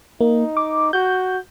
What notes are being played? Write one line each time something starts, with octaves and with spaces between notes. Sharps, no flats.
A#3 D#4
D6
F#4 G6